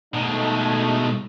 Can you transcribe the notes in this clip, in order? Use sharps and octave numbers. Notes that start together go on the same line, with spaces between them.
B2 G#3 A3 D#4